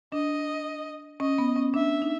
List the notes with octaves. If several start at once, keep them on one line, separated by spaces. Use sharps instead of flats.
D4 D#5
C#4 D#5
B3
C#4
D4 E5
D#4